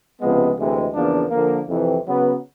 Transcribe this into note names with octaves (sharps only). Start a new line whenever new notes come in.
C#2 C3 F3 G#3 B3
D2 C3 E3 G#3
E2 C#3 F3 A#3 D4
D3 F3 A#3
F2 C3 E3
C#3 F#3 B3